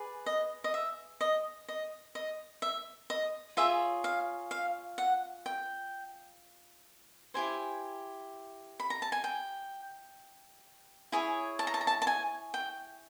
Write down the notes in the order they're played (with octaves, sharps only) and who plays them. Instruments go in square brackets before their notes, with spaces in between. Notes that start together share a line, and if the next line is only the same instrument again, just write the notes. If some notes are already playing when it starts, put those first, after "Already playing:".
Already playing: [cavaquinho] G#4 B4 D5
D#5
D#5
E5
D#5
D#5
D#5
E5
D#5
F4 G#4 C#5 E5
F5
F5
F#5
G5
E4 G4 C5 G#5
B5
A#5
A5
G#5
G5
E4 G#4 C#5
A5
A#5
A5
A#5
A5
A5
G#5
G5